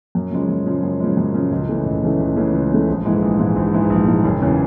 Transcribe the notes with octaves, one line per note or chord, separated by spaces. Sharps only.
F#2
C#3 F3 G#3
F#2
C#3 F3 G#3
F#2
C#3 F3 G#3
F#2
C#3 F3 G#3
C#2
C#3 E3 A3
C#2
C#3 E3 A3
C#2
C#3 E3 A3
C#2
C#3 E3 A3
A#1
G#2 E3 G#3
A#1
G#2 E3 G#3
A#1
G#2 E3 G#3
A#1
G#2 E3 G#3
F#1
E2 C#3 E3